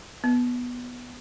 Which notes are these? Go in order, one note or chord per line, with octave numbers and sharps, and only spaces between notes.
B3